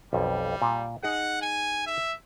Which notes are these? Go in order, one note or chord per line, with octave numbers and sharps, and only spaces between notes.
B1 F2 G3
A#2
D#4 G#4 F#5
G#5
E5